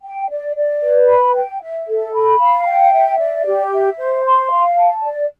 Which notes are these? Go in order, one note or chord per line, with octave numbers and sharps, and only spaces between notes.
G5
D5
D5
B4
B5
G5
E5
A4
B5
F5
G5
E5
D5
G4
E5
C5
C6
F5
A5
D5